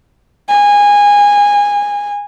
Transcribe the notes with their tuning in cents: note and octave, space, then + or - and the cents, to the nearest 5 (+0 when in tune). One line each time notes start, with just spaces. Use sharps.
G#5 -20